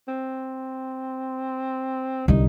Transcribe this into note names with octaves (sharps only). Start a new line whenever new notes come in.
C4
C2 D3 D#4